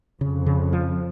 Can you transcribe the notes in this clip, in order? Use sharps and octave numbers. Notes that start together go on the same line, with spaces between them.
F2 C#3
C#3
F3